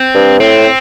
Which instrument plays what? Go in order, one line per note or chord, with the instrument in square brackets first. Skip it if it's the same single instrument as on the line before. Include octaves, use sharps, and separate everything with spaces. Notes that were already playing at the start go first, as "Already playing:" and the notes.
Already playing: [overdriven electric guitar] C4
[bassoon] G2
[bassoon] A2 [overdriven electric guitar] C4